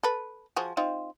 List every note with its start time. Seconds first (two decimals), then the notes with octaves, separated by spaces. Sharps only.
0.03 A4 B4
0.56 F3 F#4 G#4
0.77 C4 D#4 F4